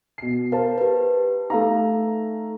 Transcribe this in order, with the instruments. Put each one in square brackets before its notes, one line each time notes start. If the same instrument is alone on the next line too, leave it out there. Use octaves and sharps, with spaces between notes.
[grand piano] B2 C7
[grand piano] A#4 C5 A5 [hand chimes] F5
[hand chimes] G4 B4
[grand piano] A3 F5 A#5 [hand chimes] D#4 A4